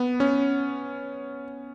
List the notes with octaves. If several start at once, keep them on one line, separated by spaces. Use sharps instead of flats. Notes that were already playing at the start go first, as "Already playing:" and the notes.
Already playing: B3
C#4